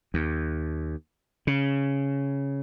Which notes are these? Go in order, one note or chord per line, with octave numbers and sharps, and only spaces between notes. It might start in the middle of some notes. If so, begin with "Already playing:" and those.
D#2
C#3